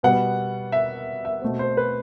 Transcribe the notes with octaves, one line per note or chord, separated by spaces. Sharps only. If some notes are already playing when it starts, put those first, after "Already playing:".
B2 G3 B3 F#5
E5
E5
B2 A3 C4
C5
B4